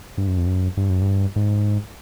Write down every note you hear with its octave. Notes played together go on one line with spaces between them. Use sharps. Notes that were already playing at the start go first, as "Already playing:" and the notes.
G2
F#2
F2
F#2
G2
F#2
G2
G#2